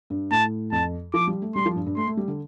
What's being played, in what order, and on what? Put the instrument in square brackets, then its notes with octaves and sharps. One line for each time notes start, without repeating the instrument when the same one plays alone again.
[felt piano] G2
[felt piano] A2 [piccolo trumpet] A5
[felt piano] F2 [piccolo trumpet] A5
[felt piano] F3 [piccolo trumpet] D6
[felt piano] G3
A3
[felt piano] G3 [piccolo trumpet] C6
[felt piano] F3
G2
G2
[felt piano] A3 [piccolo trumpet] C6
[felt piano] A3
G3
D3